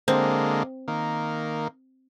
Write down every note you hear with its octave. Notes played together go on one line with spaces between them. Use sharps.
D3 G#3 A#3 C4
D#3 A#3